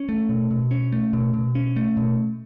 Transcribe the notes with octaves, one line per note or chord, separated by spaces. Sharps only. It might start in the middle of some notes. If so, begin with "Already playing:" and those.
Already playing: C#4
A3
B2
B2
C#4
A3
B2
B2
C#4
A3
B2